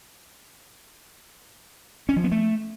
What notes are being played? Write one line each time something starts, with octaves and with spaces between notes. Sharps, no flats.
C#4
F3
B3
A3